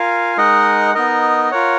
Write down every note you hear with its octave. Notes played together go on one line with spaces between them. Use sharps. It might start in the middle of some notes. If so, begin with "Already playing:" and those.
Already playing: F4 A#4 F5 G#5
G#3 D#4 A#4 D#5 F#5
B3 D#4 A#4 D#5
F4 A#4 C#5 F#5